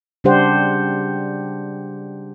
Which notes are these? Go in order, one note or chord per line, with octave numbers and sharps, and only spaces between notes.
C#3 G3 D4 G4 C5 F#5